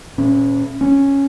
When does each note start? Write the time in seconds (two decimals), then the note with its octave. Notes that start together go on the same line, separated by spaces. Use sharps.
0.18 A#2 C#4
0.81 C#4